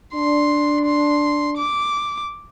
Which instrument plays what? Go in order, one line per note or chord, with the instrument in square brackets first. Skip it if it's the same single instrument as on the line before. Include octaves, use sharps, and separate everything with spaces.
[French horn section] D4 [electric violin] C6
[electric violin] C6
D6